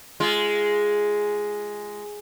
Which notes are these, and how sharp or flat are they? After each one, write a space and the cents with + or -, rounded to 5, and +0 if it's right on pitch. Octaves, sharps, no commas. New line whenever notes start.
G#3 +0 F4 -15